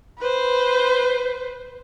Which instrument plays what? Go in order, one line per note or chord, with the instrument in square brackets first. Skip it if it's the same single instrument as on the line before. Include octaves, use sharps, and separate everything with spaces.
[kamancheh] B4 C5